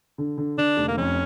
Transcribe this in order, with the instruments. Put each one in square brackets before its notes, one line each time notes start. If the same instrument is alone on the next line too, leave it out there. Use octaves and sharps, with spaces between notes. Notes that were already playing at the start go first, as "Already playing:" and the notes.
[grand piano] D3
D3
[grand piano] D3 [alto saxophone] D4
[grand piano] F1
[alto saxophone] A#3
[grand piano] F2 [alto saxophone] C#4